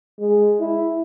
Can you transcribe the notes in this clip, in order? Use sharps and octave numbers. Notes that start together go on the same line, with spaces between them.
G#3
E4